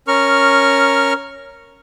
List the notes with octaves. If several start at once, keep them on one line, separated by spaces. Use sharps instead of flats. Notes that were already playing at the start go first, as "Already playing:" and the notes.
C#4 A#4 C#6 F6